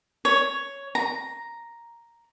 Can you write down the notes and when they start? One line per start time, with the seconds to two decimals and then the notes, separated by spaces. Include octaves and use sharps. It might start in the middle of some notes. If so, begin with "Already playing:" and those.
0.25 C#5
0.95 A#5